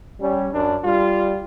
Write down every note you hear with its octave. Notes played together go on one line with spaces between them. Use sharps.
G3 C#4
F#2 D4
G3 F4